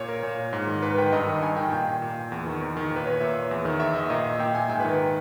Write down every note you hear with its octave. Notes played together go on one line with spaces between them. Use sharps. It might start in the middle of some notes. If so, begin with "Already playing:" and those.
Already playing: A#2 C#5
A#4
A#2
G#2
D#3
G#2 B4
D#3 G5
G2 D#5
D#3
G2 G#5
D#3 G5
A#2 G5
A#2
E2
D#3
E2
D#3
A#2
B4
C#5
A#2 E5
E2
D#3
E2 E5
D#3 D#5
A#2 D#5
E5
A#2 G5
G#5
G#2 G5
B4
D#3